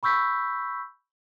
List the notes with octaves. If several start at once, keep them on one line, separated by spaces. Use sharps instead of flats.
B5 C#6 E6 G6 B6